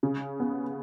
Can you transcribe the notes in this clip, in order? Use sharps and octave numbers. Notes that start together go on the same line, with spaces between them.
C#3
B3